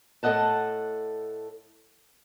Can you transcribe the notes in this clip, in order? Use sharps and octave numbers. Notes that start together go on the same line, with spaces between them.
A2 A4 A#4 D#5 F#5 A5